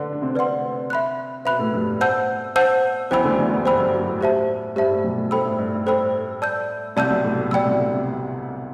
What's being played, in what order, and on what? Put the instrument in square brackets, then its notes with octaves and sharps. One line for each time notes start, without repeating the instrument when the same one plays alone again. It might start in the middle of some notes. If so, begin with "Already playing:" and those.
Already playing: [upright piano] D3 D4 [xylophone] B4 D5 F#5
[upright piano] D4
C3 C4
[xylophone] B4 D5 F#5 C6
E5 B5 F#6
[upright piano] B2 B3 [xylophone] E5 B5 F#6
[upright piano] A2 A3
G2 G3
[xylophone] C5 F#5 A5 E6 G6
C5 F#5 A5 E6 G6
[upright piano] E2 E3 [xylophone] C5 G5 B5 E6
[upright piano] D2 D3
F#3
E2 E3
F#2 F#3
[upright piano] G2 G3 [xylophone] C5 G5 B5 E6
[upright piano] G2 G3
F#2 F#3
A2
[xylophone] G4 C5 E5 A5
[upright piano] G2 [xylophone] G4 C5 E5 A5
[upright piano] A2
B1 B2
A2
[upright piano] G2 [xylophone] A4 C5 G5 B5 E6
[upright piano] A2
G2
A2
[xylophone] A4 C5 G5 B5 E6
D5 A5 E6 G6
[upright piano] C2 C3 [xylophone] D5 A5 E6 G6
[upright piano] B1 B2
A2
A2
[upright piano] B1 B2 [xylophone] D5 G5 B5 E6
[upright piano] C2 C3
D2 D3
C3